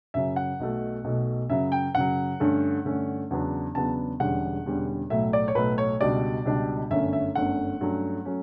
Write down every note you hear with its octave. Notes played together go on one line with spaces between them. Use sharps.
F#2 C#3 F#3 C#4 E5
F#5
B1 B2 A3
B1 B2 A3
F#2 C#3 F#3 E5
G5
F#2 C#3 F#3 F#5
G2 D3 A3 C#4
G2 D3 A3 C#4
E2 C#3 F#3 B3 D4
E2 C#3 F#3 B3 D4 A5
E1 E2 D3 G3 C#4 F#5
E1 E2 D3 G3 C#4
B1 A2 F#3 A3 E5
D5
C#5
B1 A2 F#3 A3 B4
C#5
C#2 B2 G3 D4 D5
C#2 B2 G3 D4
G1 F#2 D3 A3 C#4 E5
E5
G1 F#2 D3 A3 C#4 F#5
G2 F#3 A3 C#4
F#3 A3 C#4